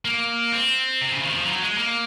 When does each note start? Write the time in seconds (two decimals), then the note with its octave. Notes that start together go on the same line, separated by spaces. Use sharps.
0.05 A#3
0.52 C4
1.01 C3
1.12 C#3
1.23 D#3
1.35 F3
1.45 F#3
1.62 G#3
1.78 A#3